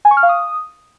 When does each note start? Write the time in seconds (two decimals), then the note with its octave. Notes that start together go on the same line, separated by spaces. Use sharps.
0.05 G#5
0.11 C#6
0.17 F6
0.23 F5
0.29 D#6